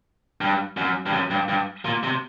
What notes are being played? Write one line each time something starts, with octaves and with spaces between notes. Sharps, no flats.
G2
F#2
G2
F#2
G2
G2
A#2
C3